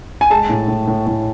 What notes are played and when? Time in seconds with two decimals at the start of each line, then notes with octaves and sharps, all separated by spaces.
0.21 G#5
0.30 G#3 A5
0.49 A2
0.68 A2
0.88 A2
1.07 A2